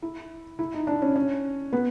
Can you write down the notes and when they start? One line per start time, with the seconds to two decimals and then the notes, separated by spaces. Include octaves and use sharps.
0.02 E4
0.59 E4
0.74 D#4
0.87 D4
1.02 C#4
1.16 C#4
1.73 B3